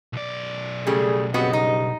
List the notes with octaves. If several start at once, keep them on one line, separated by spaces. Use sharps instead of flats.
B1 D5
C#3 G3 A3 G#4
G2 C#3 B3 C4 F#4 D#5
D#4